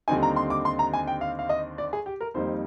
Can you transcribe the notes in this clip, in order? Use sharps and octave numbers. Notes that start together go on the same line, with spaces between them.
D#2 D3 G3 C4 D#4 G#5
A#5
C6
D6
C6
A#5
G#5
G5
F5
F5
D#5
D5
G#4
G4
A#4
F2 D#3 G3 A#3 D#4 C5